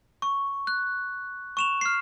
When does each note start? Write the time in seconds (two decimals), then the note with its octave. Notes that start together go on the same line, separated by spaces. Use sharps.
0.22 C#6
0.67 F#6
1.57 C#6 E7 F7
1.81 F6 C7